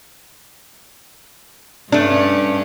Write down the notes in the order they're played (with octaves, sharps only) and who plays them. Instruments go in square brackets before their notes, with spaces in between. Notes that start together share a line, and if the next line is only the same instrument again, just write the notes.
[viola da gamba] G2 C#4 [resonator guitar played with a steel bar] A3 D4